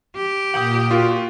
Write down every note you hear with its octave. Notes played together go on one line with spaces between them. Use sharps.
G4
A#2 F#5 G5 D#6
F4 F#4